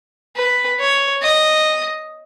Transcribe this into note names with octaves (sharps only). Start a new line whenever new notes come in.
B4
C#5
D#5